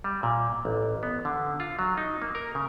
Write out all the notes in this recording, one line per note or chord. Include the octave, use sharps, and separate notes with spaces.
G3
A#2
A1
B3
D3
F4
F#3
D#4
A#3
A#4
C#3